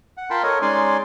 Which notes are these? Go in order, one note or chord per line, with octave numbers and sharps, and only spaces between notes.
F#5
F4 A#4 G5 A5 B5 C6
A4 A#4 C#5 D#5
G#3 C#4 D#4 D5 G#5 C6